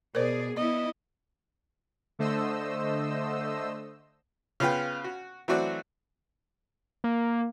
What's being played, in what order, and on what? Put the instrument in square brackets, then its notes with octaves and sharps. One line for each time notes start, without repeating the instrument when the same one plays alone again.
[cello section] B2 G#4 [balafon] A#4 C5 [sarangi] D5
[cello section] B3 E4 [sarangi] D#5
[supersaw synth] D3 A3 C5 D#5 E6
[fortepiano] C#3 B3 F4 B4 G5
F#4
E3 F#3 A3 C4 F#4 D5
[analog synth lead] A#3